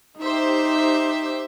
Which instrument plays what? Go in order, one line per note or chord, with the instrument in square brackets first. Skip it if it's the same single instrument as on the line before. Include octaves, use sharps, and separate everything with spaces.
[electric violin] D#4 [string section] G4 C5 E5